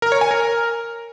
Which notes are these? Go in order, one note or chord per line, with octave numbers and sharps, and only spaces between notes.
A#4
C#5
G#5
A#4